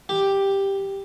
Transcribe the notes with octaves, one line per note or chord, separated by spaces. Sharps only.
G4